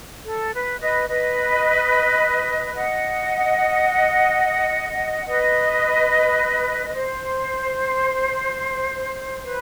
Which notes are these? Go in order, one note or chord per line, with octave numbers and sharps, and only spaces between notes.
A4
B4
B4 D#5
B4 D#5
D#5 F#5
B4 D#5
B4
C5
B4